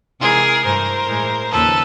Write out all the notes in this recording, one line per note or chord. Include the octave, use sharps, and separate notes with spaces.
C3 E3 G#3 G#4 A#4
G2 E3 A3 A#4 C5
A2 E3 G#3
D#2 C#3 F3 A4 B4